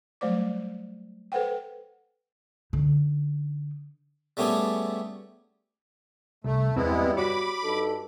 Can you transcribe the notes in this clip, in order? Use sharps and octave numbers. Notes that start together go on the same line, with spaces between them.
F#3 G3 A3 C5 D5 D6
A4 B4 C5 F#5 G5
D3 D#4
G3 A3 B3 C#4 G4 G#4
C2 A3
E2 G2 E3 G3 G#3 B3 C4 E4
F#4 C#5 B5 D6
G2 D#4 A4